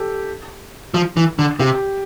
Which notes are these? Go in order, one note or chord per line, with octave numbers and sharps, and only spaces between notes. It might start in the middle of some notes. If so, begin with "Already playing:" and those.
Already playing: G4 A4
F3
E3
D3
C3 G4